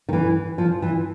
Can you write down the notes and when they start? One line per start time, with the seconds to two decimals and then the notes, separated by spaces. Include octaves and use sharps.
0.09 D#3
0.13 E3
0.58 F3
0.82 E3